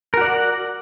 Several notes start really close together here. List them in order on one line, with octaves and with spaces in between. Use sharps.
A#4 F#4 D5 F#5